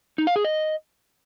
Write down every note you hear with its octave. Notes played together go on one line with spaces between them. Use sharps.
D#4
F5
G#4
D#5